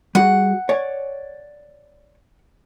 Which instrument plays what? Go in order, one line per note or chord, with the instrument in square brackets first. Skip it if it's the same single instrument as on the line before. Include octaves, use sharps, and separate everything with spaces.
[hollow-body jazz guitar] G3 F#4 G#4 [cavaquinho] F#5
[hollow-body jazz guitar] C#5 D5 G#5